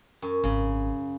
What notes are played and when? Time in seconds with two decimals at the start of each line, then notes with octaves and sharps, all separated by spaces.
0.22 F#2
0.44 G#1 C#3